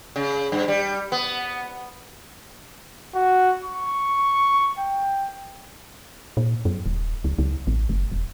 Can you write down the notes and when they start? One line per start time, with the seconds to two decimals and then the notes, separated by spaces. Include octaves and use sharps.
0.16 C#3
0.52 G2
0.68 G3
1.12 B3
3.15 F#4
3.64 C#6
4.79 G5
6.37 A#2
6.65 F#2
6.86 D#1
7.24 C#2
7.38 C#2
7.67 A1
7.89 F#1
8.12 E1